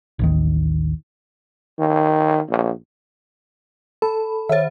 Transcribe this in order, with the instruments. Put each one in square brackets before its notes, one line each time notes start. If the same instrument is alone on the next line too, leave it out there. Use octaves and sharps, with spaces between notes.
[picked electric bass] A1 D#2 D#3
[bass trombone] D#3
A#1
[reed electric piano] A4 [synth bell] B5
[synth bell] D#3 C5 [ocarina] C#5 [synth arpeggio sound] E5 A6